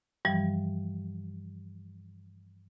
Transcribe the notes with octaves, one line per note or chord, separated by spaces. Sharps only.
G2 E3 F3 G3